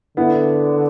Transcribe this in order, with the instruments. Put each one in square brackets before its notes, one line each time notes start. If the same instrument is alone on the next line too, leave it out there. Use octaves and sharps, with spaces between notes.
[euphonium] D3 [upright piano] B3 E4